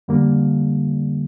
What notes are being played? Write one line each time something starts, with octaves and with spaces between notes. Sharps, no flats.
F2 D3 G3 A#3